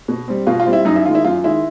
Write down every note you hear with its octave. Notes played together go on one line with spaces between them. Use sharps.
B2
G3 C4
B2 F4
F4
G3 C4
E4
F#2 D#4
E4
D#3 G#3 F4
E4
F#2 F4
D#3 G#3 E4